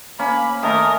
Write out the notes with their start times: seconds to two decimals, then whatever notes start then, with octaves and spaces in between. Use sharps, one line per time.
0.19 A#3 C#4 B5
0.63 D#3 A3 C#4 A#4 D#6